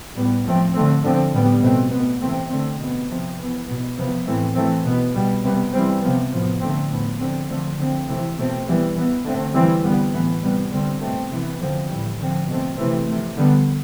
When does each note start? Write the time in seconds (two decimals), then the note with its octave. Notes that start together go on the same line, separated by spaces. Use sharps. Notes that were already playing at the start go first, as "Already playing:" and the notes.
0.15 A2 G3 B3
0.45 A2 F3 A3 C4
0.74 D3 A3 C4
1.02 D3 F3 C4
1.32 A2 G3 B3
1.61 B2 A3 C4
1.90 B3
1.96 B2
2.21 C3 E3 A3 C4
2.50 D3 A3 C4
2.79 B2 B3
3.09 C3 F3 C4
3.37 E3 B3
3.67 B2 B3
3.96 C3 F3 B3
4.26 A2 E3 A3 C4
4.55 E3 A3 C4
4.84 B2 B3
5.14 B2 G3 B3
5.43 C3 G3 B3
5.73 E3 G3 C4
6.01 C3 F3 B3
6.31 A2 F3 B3
6.60 D3 A3 C4
6.90 A2 F3 B3
7.19 D3 F3 C4
7.49 D3 F3 A3 C4
7.77 D3 F3 C4
8.07 C3 E3 A3 C4
8.37 B2 A3 C4
8.66 E3 G3 B3
8.95 E3 B3
9.24 D3 A3 C4
9.54 E3 G3 C4
9.83 D3 G3 B3
10.13 A2 E3 B3
10.42 C3 G3 B3
10.72 D3 G3 C4
11.00 B2 A3 C4
11.30 C3 E3 B3
11.60 D3 F3 C4
11.88 A2 E3 G3
12.18 D3 F3 C4
12.47 B2 A3 C4
12.77 C3 E3 A3 C4
13.06 C3 F3 A3
13.36 D3 G3 B3